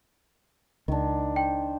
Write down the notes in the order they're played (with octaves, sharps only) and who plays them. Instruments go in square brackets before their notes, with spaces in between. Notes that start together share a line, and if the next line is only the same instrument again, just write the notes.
[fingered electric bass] C#2 [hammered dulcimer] D#3 D4
[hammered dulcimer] C5 [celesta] G5